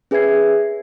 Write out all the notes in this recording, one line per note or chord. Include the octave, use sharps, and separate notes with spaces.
C#4 G#4 B4 E5 G#6 C7